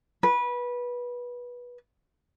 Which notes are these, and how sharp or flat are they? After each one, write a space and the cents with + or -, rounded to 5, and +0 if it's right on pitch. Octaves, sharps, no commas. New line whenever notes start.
B4 -20